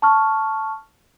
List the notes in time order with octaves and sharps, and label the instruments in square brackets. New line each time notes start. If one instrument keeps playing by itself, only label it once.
[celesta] A5 C#6 F6